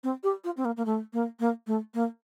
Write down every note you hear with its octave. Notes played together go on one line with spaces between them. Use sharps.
C4
G4
F4
C4
A#3
A#3
A3
A#3
A#3
A3
A#3